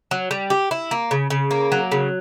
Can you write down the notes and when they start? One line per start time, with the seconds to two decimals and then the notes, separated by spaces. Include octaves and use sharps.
0.11 F#3
0.31 G3
0.50 G4
0.71 E4
0.91 A#3
1.11 C#3
1.30 C#3
1.51 A#3
1.72 F#3
1.92 C#3